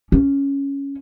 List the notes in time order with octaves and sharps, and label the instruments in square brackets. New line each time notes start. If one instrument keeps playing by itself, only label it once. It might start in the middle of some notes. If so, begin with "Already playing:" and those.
[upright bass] C#4